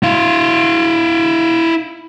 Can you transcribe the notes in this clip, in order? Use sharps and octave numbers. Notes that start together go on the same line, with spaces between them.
E4 F5